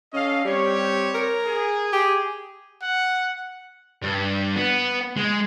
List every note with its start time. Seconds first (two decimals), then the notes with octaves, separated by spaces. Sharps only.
0.13 C#4 A4 D#5 F5
0.45 G3 C4 G4 C#5
1.14 A#4
1.45 G#4
1.93 G4
2.82 F#5
4.02 G2
4.56 B3
5.17 G#3